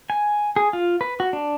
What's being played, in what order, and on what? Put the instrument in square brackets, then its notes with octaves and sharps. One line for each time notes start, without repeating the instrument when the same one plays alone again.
[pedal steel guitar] G#5
G#4
F4
B4
F#4
D4